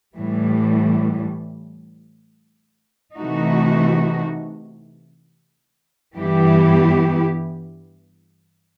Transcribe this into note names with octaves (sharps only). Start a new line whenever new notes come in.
A2 E3 G3
C3 E3 A3 D#4 F#4
G2 E3 B3 E4 G4